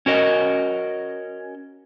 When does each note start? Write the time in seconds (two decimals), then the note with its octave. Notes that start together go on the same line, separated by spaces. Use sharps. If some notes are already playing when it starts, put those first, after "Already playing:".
0.06 C#4 F#4 A#4 D#5